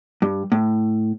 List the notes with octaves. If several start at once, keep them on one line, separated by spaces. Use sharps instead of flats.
G2
A2